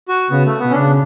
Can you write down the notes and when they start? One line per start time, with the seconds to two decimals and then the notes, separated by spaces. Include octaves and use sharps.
0.09 F#4
0.30 C#3 B3
0.45 A3
0.59 B3
0.64 B2
0.70 C#4
0.73 C#3 D4